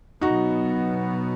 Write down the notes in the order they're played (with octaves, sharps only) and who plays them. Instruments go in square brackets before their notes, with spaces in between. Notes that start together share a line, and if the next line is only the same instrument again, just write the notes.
[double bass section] B2 F#3 B3 [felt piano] D#4 F#4